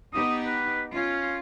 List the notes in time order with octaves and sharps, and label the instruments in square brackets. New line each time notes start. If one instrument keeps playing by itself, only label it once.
[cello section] B3 D#4 G4 [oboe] D#6
[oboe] B4
[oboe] C#4 [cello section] F4